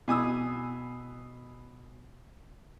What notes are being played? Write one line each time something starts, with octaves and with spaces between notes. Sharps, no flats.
B2 G#5 D#6 E6